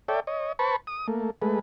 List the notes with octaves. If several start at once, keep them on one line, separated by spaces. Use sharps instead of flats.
A4 C#5 D5 E5 G5
C#5 D#5
B4 C5 A5 B5 C#6
D#6
A3 A#3
G#3 A3 B4